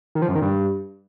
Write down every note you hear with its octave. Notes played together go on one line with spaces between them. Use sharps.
D#3
F3
F#2
D#3
G2